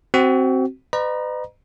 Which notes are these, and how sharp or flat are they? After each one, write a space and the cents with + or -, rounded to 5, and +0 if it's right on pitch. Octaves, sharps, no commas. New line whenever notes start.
C4 +0 F#4 +25
B4 +40 D#5 -40 A#5 +25